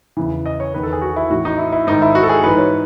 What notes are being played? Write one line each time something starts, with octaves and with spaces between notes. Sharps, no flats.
E2 C#3 E3
D#5
C#5
E2 D#3 B4
A4
G#4
F#4
E4
A2 E3 F#4
D#4
E4
E4
G#2 D#3 D#4
E4
F#4
A4
G#4
G#2 E3 B4
C#5